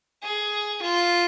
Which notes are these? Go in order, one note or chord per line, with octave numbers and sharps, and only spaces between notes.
G#4
F4